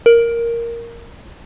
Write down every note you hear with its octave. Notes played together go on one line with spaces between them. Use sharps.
A#4